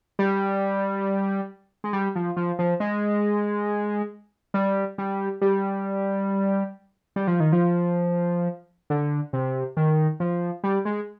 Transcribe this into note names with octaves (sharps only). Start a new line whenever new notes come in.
G3
G#3
G3
F3
F3
F3
G#3
G3
G3
G3
G3
F3
D#3
F3
D3
C3
D#3
F3
G3
G#3